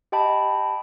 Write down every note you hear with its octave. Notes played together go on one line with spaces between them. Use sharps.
G4 D#5 G5 A5 B5